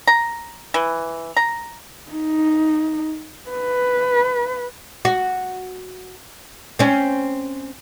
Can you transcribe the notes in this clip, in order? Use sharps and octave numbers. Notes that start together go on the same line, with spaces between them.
A#5
E3
A#5
D#4
B4
F#4
C4 C#4